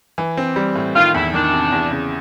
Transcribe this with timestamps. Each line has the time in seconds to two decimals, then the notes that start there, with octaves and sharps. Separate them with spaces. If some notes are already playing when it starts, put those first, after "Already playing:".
0.18 E3
0.37 C4
0.56 G3
0.76 A2
0.95 D#3 F4
1.14 E2 E4
1.34 D#3 D4
1.53 C3
1.72 E2
1.91 C#3